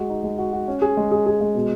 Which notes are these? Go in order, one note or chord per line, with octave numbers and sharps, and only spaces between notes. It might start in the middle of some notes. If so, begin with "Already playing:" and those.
Already playing: G#3 F#4
D#4
G#3
F#4
F#4
C#4
G#4
G#3
G#4
G#4
G#3
B2